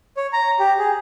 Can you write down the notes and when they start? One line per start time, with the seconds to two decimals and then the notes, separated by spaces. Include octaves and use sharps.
0.17 C#5
0.33 A#5
0.59 G4
0.79 G#4